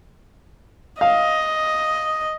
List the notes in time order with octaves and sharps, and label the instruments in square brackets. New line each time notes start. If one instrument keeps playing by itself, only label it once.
[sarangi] D#5 [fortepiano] F5